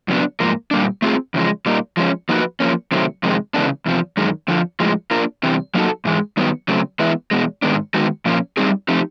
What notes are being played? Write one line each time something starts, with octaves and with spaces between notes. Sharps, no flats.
F#2 C#3 F#3 B3 D4
G#2 F3 A#3
A#2 G3 A#3 D4
A3 C4 F4 G#4
E2 C#3 F3 G#3
A#2 G3 A#3 D#4
F3 G#3 C#4
F3 A#3 D#4 F#4 B4
F3 A#3 C#4
C3 D#3 F#3 A3 C4
F2 C3 D#3 G#3
C#3 E3 G#3 B3 D4
E2 C3 F3
F#2 D#3 G#3
F2 D3 F3
A2 F3 G#3
A#3 D4 F4 A#4
E2 C3 E3 G3 C4
F#3 A#3 D#4 F#4 A4
G#2 E3 G#3
G2 D#3 F#3 B3
C#3 F#3 A3 C4
E3 G#3 B3 E4
E2 B2 G#3
G#2 D#3 G#3 B3 D4
D#3 G#3 B3 D#4 F#4
A#2 F3 A#3 C#4 F4
G3 C4 D#4 G#4
F3 A3 C4 D#4 G4